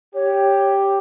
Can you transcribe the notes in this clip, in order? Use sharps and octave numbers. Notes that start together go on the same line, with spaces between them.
G4 C#5